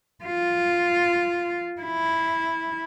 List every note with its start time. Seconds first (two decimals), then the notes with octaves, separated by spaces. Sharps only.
0.24 F4
1.82 E4